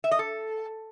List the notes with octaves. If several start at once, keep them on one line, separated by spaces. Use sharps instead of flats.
E5
D#5
A4